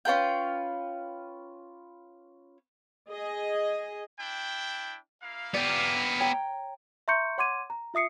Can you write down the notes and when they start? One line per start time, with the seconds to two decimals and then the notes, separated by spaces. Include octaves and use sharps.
0.05 C#4 F4 B4 G5
3.09 G#4 D#5
4.19 D4 E4 G5
5.23 A#3 E4 F5
5.54 B3 G4 D5
6.20 C#5 G5 A#5
7.08 E5 A#5 C6 C#6 G6 C#7
7.38 C#5 F#5 C6 D6 G#6 D#7
7.70 A#5
7.94 F4 E5 D#6 C7 C#7